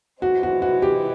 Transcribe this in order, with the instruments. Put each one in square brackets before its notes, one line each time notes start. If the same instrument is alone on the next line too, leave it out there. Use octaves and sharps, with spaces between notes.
[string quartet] C3 E3 G#3 C4 [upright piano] F#4
[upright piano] F#4
F#4
G4